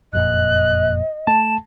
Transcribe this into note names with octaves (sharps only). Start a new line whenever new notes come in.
F#1 F2 A#2 D#5 F#6
A3 A5 E7